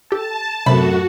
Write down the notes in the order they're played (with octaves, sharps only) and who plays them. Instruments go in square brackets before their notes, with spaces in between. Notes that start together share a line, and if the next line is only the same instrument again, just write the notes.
[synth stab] G4 A4 [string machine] A5
[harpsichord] F#2 A2 [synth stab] C3 [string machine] F#4 [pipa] B5